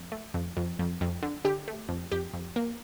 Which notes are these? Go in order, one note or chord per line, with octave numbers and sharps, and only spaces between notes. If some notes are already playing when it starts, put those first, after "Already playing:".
Already playing: F2
A3
F2
F2
F2
F2
D3
D3 G4
A3
F2
F2 G4
F2
A#3